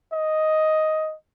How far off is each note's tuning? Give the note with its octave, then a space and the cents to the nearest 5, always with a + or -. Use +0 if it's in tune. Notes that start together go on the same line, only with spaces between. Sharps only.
D#5 +5